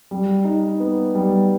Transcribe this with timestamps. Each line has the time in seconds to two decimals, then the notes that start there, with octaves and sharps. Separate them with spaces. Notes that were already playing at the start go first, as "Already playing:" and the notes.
0.11 G3
0.44 D#4
0.80 B3
1.15 G3